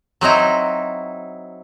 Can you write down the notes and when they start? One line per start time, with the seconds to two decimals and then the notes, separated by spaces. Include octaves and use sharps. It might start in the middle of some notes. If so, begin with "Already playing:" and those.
0.21 F#3 C4 D#4 E4